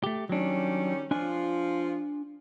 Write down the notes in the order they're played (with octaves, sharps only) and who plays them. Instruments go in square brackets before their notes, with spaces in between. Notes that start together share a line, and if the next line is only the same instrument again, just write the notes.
[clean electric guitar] A3 G4
[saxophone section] D#3 G3 C#4 [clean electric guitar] F#3 D4
[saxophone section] F3 F4 [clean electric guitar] D4 G#5